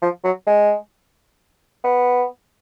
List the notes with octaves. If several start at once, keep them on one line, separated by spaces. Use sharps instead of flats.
F3
F#3
G#3
B3